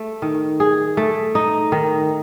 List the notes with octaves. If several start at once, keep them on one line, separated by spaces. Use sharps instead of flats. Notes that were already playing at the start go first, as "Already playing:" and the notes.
Already playing: A3
D#3
G#4
A3
D#4
D#3